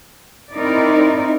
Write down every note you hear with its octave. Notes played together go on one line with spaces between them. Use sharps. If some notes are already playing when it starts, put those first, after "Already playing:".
C4 D#4 E4 A#4 D5